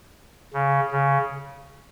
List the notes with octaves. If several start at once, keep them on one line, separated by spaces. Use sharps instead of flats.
C#3
C#3